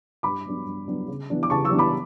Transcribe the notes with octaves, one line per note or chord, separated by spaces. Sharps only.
G2 B5 D6
F#3 B3 D4
G2
F#3 B3 D4
C#3
E3 B3 D4
D6
C#3 A5 C#6
C#6 E6
E3 B3 D4
B5 D6